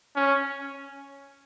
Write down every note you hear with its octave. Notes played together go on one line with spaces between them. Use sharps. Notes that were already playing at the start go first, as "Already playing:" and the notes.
C#4